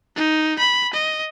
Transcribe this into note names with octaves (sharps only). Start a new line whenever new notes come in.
D#4
B5
D#5